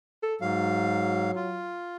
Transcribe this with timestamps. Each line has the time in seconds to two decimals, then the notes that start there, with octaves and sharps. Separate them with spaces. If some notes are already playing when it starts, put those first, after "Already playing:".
0.23 A4
0.41 G#2 F#3 F5
1.36 F4